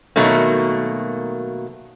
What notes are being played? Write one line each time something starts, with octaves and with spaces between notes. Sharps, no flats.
B2 D#3 F#3 A3 A#3